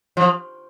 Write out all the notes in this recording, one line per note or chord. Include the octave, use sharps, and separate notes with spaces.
F3